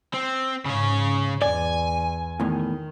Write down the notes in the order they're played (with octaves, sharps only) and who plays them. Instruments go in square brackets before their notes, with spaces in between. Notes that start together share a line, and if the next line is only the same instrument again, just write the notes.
[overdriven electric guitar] C4
[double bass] G#2 [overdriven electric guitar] C#3 C#5
[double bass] E2 [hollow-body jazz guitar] D5 [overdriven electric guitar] G#5
[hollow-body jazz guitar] E2 A2 [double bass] D#3